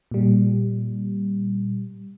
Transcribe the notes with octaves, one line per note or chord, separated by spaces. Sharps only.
A#2 G3